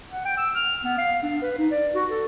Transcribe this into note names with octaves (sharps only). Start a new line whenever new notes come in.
F#5
G5
E6
F6
B3
F5
D4
B4
D#4
D5
F#4
A4